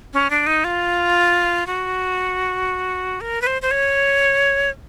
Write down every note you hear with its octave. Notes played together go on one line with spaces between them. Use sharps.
C#4
D4
D#4
F4
F#4
A#4
B4
C5
C5
C#5